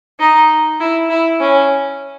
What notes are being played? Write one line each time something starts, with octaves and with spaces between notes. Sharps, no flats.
D#4
E4
E4
C#4